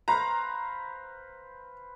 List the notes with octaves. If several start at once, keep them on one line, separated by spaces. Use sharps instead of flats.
B4 C5 F5 A#5